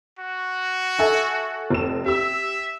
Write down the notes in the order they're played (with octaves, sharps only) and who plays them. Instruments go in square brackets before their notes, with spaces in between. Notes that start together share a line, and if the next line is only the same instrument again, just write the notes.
[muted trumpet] F#4
[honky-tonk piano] A4 E5 G#5
F1 E7
[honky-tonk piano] G4 E6 [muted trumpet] E5